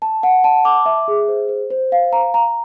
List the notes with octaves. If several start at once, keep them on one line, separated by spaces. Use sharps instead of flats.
A5
F#5
A5
D6
E5
G#4
C5
C5
C5
F5
A#5
A#5